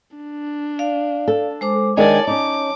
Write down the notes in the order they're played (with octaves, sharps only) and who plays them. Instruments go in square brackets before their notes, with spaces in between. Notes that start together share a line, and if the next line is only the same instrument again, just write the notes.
[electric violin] D4
[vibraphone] D5 F5
[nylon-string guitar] A4
[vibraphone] G#3 C5 D6
[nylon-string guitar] D#3 G#3 D4 [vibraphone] C#5 A5 [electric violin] D5 G#5
[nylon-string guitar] C#4 D#4 [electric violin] D6